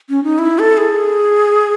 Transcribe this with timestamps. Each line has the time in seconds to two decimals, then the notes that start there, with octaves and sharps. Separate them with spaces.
0.10 C#4
0.24 D#4
0.39 E4
0.59 A4
0.77 G#4